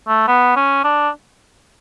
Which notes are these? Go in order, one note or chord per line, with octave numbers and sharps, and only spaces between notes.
A3
B3
C#4
D4